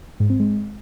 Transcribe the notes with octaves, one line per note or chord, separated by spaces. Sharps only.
G#2
C4
G#3